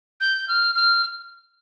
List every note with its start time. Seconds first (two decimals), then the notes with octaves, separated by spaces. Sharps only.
0.20 G6
0.48 F6
0.75 F6